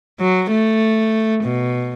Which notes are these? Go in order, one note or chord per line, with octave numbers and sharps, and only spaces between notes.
F#3
A3
B2